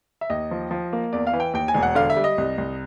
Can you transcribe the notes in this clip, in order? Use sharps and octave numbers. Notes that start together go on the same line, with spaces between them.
E5
D#2 D#5
F3
F3
A#3
E2 D5
F5
E3
G5
D#2 G5
G#5
E1
F#5
D3 F5
E5
G3
D#5
C2
C2